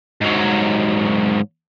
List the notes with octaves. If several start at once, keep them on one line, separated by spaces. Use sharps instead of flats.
G#2 F#3